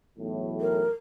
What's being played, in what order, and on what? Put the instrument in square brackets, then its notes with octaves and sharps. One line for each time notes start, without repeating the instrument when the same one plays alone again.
[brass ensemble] B1 E2 A2
[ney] A#4